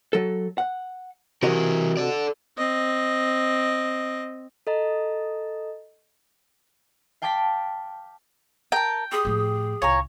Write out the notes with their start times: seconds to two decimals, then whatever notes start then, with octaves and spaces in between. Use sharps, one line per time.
0.13 F#3 A4
0.58 F#5
1.43 C3 E3 F#4 A#4 D#5
1.97 A4 D5
2.58 C4 D#5
4.67 A4 D#5 A#5
7.22 F5 G5 A5 D6 G6 B6
8.72 A#4 G5 A5
9.12 G4 G#4 C6 D#6
9.25 A2 F3
9.82 C2 F4 C#5 G#5 A#5